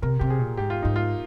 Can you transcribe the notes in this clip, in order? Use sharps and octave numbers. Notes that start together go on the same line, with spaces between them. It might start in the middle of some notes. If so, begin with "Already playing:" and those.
C3 A#4
C3 G4
G#4
A#2
G#2 G4
F4
G#2 D#4
F4